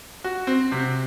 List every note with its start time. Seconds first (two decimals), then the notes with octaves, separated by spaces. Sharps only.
0.24 F#4
0.47 C4
0.72 C3